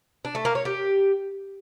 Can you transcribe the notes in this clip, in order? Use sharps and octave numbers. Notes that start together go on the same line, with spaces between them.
D4
A3
A#3
C#5
G4